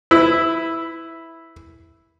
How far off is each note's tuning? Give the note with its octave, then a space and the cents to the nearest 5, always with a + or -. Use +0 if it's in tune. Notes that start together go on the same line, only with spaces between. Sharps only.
E4 -5 B4 +25